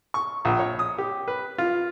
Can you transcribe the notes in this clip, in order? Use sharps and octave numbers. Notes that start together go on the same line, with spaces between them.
C#6
A#1
C#5
D#6
G4
B4
F4